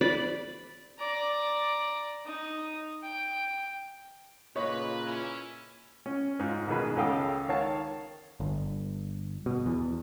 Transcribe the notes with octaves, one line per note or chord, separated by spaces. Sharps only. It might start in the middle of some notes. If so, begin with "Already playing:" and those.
D5 B5
D5 A#5
D#4
G5
A#2 C#3 A#3 B4 C#5 D#5
C#4 E4
C#4
G#2 F4
A1 B2 D#3 G#4 B4
C#2 C#3 A4 F5 G5 D#6
D#3 C#5 F5 A5
G1
B2
E2